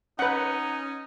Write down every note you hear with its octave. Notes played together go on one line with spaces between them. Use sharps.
C#4 D#4 B4 F#5